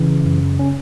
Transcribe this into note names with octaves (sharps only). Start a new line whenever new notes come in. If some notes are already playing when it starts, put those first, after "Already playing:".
Already playing: C#3 E3
F#2
C#4